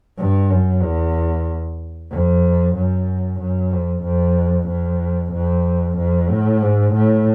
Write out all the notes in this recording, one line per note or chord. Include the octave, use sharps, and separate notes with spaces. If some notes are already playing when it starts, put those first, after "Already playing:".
G2
F#2
E2
F2
F#2
F#2
F2
F2
F2
F2
F2
A2
G#2
A2